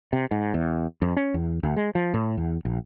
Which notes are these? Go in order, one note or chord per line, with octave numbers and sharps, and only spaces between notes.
C3
G#2
E2
F2
C#4
E2
D2
G#3
F3
A2
E2
A#1